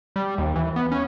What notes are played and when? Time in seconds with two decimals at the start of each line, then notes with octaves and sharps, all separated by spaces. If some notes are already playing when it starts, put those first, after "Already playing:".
0.16 G3
0.38 D#2
0.55 E3
0.76 B3
0.92 C#4